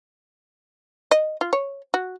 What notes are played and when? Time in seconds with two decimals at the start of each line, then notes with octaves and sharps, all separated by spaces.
1.11 D#5
1.41 F4
1.53 C#5
1.94 F#4